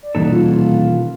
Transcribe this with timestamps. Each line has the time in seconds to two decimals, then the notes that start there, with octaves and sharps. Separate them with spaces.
0.03 D5
0.15 D#1 B2 E3 D#4 A4
0.32 F4